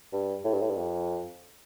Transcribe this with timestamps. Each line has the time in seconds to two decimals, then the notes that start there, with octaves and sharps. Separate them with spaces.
0.12 G2
0.44 A2
0.53 G2
0.62 A2
0.69 G2
0.77 F2